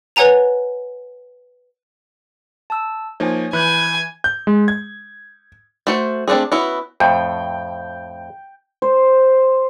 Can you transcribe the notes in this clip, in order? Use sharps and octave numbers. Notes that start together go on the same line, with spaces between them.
B4 C#5 F#5 G#5 A#5 F7
A5 E6
F3 A#3 D#4 C#5 G#5
E3 G#5 B5 F#6 G6
G6
G#3
G#6
A3 F#4 C5
A3 C4 D4 D#4 G#4
B3 C#4 E4 F#4
F2 A2 G5
C5